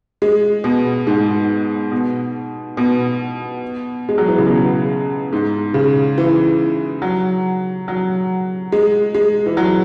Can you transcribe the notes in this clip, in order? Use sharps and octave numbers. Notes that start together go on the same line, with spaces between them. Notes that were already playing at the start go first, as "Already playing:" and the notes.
G#3
B2
G#2
B2
B2
G#3
F#3
E3
C#3
B2
G#2
C#3
E3
F#3
F#3
G#3
G#3
E3
F#3